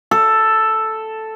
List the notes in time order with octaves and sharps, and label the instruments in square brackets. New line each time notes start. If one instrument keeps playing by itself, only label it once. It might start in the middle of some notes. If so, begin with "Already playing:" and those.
[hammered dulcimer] A4